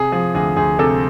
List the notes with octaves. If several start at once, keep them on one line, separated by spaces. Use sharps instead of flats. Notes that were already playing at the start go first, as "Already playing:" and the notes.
Already playing: C3 G#4
F3 G#4
D2 G#4
D2 G#4
C3 A4